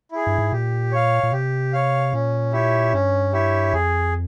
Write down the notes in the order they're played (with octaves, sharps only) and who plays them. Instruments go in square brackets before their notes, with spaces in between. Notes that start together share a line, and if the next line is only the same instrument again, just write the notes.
[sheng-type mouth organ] E4 G#4
[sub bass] G2
G#2
[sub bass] A#2 [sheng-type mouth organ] G4
[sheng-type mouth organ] C#5 F5
[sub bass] A#2
[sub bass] C3 [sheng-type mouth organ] G4
[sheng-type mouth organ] C#5 F5
[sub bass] A#2 [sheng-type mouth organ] C#4
[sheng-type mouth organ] E4 G4 C#5 E5
[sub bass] G2 [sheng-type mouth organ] C#4
[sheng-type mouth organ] E4 G4 C#5 E5
[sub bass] F2 [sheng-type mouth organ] G#4